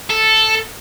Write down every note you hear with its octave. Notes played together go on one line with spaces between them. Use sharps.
A4